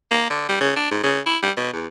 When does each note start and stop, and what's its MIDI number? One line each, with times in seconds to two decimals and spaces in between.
0.11 0.28 58
0.30 0.45 50
0.49 0.56 55
0.61 0.72 49
0.76 0.91 62
0.91 1.01 44
1.03 1.20 49
1.26 1.38 64
1.43 1.51 55
1.57 1.70 47
1.73 1.86 40